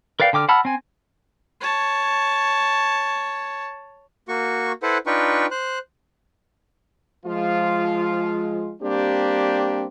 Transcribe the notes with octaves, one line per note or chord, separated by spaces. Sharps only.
A#4 B4 D5 F5 G5
D3 G5 D6 F6
F#5 A5 B5 E6 F6
C4 G#5
C#5 A5
A#3 F#4 C#6
E4 A4 B4 C5 F#5
D4 D#4 F4 B4 G5 C#6
C5 F#6
F3 G#3 F4
G3 A#3 C4 D4 G4